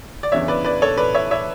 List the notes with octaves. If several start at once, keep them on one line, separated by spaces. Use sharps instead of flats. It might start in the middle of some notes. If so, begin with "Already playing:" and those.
D5
E2 C#3 E3 B3 D4 C#5 E5
B4 D5
B4 D5
A4 C#5
B4 D5
C#5 E5
C#5 E5